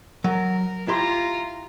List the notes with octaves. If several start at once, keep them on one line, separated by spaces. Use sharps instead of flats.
F#3 A#4
E4 F4 G4 A#5 C6